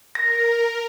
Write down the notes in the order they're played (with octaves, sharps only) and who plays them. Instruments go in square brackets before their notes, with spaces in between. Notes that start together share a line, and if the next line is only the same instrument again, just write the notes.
[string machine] A#4 [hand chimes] A#6